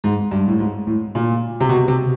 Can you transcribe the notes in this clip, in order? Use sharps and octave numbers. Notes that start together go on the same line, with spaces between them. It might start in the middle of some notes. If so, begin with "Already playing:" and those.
G#2
G2
A2
G#2
A2
A#2
C3
B2
C3